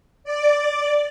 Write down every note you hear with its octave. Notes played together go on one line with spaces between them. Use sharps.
D5